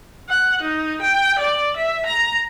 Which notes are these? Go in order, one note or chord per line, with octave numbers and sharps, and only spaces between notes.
F#5
D#4
G5
D5
E5
A#5